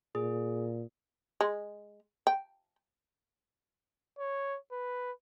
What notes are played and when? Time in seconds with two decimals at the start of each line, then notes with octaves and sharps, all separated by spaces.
0.15 A#2 G#4
1.41 G#3
2.27 G5
4.19 C#5
4.72 B4